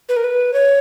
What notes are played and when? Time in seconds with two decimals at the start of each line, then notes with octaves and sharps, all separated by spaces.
0.09 B4
0.17 A#4
0.24 B4
0.54 C#5